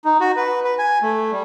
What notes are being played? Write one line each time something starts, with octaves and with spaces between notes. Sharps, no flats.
D#4
F#4
B4
B4
G#5
A3
G3